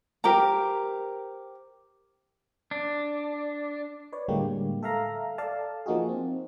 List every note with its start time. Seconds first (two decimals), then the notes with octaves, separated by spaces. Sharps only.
0.24 G4 A#4 C5 A#5
2.71 D4
4.12 B4 C#5 D5
4.28 A2 D3 G3 G#3 A#3 G4
4.83 A4 E5 F5 A#5
5.38 A4 D5 F5 A5
5.86 F3 A#3 D#4 F#4 G#4
6.09 C4